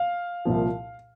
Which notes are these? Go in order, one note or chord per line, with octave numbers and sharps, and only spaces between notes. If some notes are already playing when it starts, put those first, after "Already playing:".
Already playing: F5
C2 A#2 F3